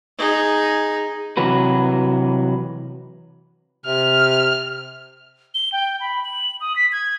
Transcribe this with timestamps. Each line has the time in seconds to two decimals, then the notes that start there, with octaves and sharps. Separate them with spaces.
0.18 D#4 G#4
1.37 C3 E3 F#3 F#4 B4
3.86 C3 F6
5.54 G7
5.73 G5
6.00 B5
6.25 F#7
6.61 D#6
6.76 B6
6.92 G#6